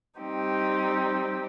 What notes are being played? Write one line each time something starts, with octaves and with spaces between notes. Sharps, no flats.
G3 C4 D#4 G4